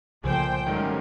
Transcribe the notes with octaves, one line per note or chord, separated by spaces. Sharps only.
C2 A#2 C#3 F3 A3 C5 G5 G#5
G#2 D#3 F#3 G3 A3 C#4